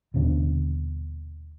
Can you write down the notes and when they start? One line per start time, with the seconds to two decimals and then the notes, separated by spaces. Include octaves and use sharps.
0.14 D#1 D#2 B2 D3